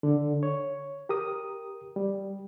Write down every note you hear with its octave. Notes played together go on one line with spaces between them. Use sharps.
D3
C#5
G4 A#4 D#6
G3